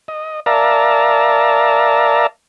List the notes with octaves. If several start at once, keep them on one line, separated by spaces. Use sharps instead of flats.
D#5
A#4 D5 E5 F5 A5 A#5